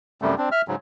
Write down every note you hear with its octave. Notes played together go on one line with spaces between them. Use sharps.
F#2 C3 G3 A3
C4 D4
E5 F6
G#2 C#3 F#3